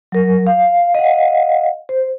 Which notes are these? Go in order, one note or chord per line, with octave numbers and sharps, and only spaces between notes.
F#3 A#4
F5
D#5 F5 F#5
C5